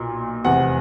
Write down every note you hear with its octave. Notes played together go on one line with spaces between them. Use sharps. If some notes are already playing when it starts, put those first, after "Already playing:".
Already playing: B1 A#2
F1 E2 C3 F#5